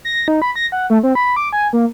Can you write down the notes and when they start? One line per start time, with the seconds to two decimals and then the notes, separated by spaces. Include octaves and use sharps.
0.05 A#6
0.28 D#4
0.42 B5
0.56 A#6
0.72 F#5
0.90 A3
1.03 C4
1.15 B5
1.36 D6
1.53 G#5
1.73 A#3